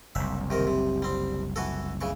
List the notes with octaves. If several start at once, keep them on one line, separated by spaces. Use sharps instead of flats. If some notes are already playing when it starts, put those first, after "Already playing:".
F#1 C2 E5
C3 D#3 A#4
C3
G3 C4
E3 F#4 A4
C#3 E3 C#6